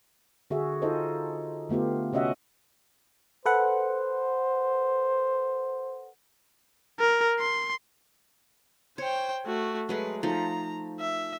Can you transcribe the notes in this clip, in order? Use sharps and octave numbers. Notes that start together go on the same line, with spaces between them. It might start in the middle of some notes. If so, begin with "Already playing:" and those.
D3 F#4 G#4 E5
D#4 F4 A4 C5 D#5
D3 A3 B3 F4 G4
C3 C#4 F#4 D#5 E5 F#5
A4 B4 C5 F#5
A#4
C6
C5 C#5 G5
A3 F#4
F#3 G#3 A3 B4
F3 A3 D#4 A#5
E5